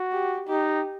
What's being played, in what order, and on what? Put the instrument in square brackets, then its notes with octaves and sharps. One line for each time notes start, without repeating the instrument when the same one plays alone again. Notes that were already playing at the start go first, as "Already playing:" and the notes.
Already playing: [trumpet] F#4
[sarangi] G4
[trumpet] D#4 [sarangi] G4